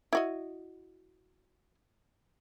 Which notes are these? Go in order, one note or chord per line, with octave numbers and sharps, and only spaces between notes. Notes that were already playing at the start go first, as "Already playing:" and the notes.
E4 F#4 D#5